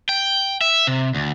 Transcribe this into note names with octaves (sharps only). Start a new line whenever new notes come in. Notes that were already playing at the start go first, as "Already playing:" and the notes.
G5
E5
C3
D2